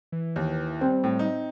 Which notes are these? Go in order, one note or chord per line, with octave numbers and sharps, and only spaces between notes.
E3
D#2
G3 C4
A2
D#4